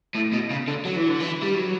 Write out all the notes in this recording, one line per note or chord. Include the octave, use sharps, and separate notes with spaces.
A2
B2
C#3
D3
F#3
E3
D3
E3
G3
F#3